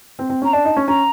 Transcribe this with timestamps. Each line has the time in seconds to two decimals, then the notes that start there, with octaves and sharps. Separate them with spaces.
0.19 C4
0.30 C4
0.42 C#4
0.45 A#5
0.53 D4 A5
0.65 D#4
0.77 C#4
0.88 C#4 A#5